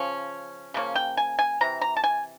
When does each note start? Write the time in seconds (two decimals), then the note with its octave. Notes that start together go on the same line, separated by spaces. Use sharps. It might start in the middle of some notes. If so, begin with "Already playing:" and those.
Already playing: C#3 F3 C#4
0.74 C#3 F3 A#3 C#4
0.95 G5
1.17 G#5
1.39 G#5
1.61 C3 E3 A#5
1.81 A#5
1.97 A5
2.04 G#5